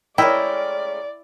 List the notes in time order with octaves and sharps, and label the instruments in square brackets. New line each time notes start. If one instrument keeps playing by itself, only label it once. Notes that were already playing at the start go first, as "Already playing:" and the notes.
[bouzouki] G#3 A3 C#4 [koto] E4 [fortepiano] A#4 D#5 G5 [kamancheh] D5